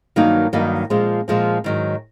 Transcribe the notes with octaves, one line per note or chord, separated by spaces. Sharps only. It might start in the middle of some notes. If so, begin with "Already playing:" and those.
G2 D#3 F#3 A#3 D#4
G2 D#3 F#3 A#3 D#4
A#2 F3 G#3 C4
A#2 F3 G#3 C4
G#2 D#3 F#3